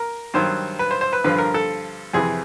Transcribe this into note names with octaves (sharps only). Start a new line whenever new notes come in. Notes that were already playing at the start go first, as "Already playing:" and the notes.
Already playing: A#4
G2 D#3 F#3 C5
B4
C5
C5
B4
G2 D3 F3 B4
A#4
A4
F2 C3 E3 G#4